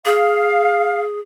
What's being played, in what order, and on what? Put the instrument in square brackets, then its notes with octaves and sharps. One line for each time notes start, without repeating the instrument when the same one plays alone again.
[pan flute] G#4 [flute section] F5